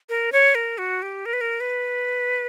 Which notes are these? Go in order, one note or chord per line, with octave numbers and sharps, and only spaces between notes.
A#4
C#5
A#4
F#4
G4
A#4
B4
A#4
B4